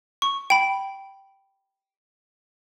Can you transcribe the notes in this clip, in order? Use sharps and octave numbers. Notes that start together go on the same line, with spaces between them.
C#6
G5 B5